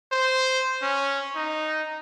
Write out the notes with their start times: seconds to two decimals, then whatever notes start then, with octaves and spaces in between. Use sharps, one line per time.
0.12 C5
0.82 C#4
1.36 D#4